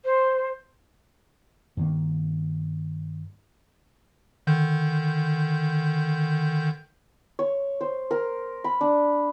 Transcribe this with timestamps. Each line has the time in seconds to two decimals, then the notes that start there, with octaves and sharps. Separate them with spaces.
0.05 C5
1.77 G2 D#3 A#3
4.47 D3 D#3 G6
7.39 C#5
7.81 C5
8.11 A#4
8.64 B5
8.81 D4